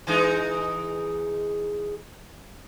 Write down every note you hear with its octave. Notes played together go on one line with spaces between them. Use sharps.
E3 G#3 D#4